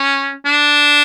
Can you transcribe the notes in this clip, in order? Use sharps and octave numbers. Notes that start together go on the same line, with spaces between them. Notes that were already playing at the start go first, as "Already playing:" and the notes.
Already playing: C#4
D4